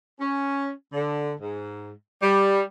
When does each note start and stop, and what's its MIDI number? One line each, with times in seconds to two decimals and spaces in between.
0.20 0.70 61
0.93 1.33 50
1.39 1.90 44
2.22 2.61 55